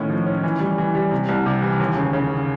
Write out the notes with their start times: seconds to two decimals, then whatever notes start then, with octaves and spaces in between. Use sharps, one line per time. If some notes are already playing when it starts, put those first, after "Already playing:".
Already playing: A2 D#3 C#4
0.10 F3
0.26 C#4
0.43 E3
0.60 G3
0.78 E3
0.95 G3
1.11 C3
1.29 C2
1.46 C3
1.62 E3
1.80 D#2
1.97 C#3
2.13 C#3